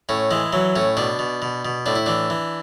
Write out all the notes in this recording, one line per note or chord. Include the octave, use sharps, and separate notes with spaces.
A2 C#4
E3 G#3
E3 F#3
A2 C#4
B2 D4
B2
B2
B2
A2 D4
E4
E3 D4
E3